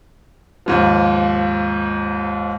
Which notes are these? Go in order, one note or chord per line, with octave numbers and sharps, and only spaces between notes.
D#2 G#2 F3